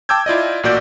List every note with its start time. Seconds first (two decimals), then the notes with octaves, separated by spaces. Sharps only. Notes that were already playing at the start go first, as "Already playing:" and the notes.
0.09 G5 A5 D6 E6 G6 G#6
0.26 E4 F4 D5 D#5
0.63 A1 A#2 F#4 D5 G6